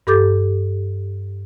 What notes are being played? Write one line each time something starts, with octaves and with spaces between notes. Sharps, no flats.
G2 G4 A4 D6 G6 A6